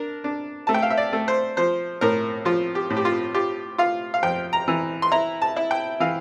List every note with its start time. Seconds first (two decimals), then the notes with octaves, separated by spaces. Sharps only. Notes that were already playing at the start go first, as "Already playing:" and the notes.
Already playing: D4 A#4
0.24 D4
0.67 A3 A5
0.74 G5
0.83 F5
0.90 E5
0.97 D5
1.13 A3
1.28 C5
1.57 F3 C5
2.01 A2 A#4
2.45 F3 F4
2.75 G4
2.90 A2
2.97 G4
3.05 F4
3.34 F4 G4
3.78 F4 F5
4.14 F5
4.23 F2 G5
4.53 A#5
4.68 E3
5.02 C6
5.12 E4 A#5
5.42 A5
5.57 E4
5.71 G5
6.00 E3 F5